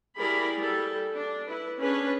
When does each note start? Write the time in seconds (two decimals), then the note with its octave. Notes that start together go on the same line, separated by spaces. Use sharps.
0.18 G3 E4 G#4 A#4 D5 B5
0.59 G3 A4
1.14 D4
1.47 E4 B4
1.80 C#4 D4 G#4 B4 C#5